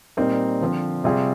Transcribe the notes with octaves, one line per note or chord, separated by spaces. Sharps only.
A#2 G3 C4 D#4 A#4
D3 F3 C4
C3 G3 C4 F4 G#4